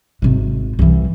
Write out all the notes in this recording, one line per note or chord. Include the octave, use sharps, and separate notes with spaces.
G#1 C3
C2 E3